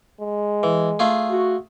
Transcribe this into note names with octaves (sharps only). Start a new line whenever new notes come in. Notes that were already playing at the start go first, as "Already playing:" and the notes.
G#3
E3
A3 F4 G#4
F#4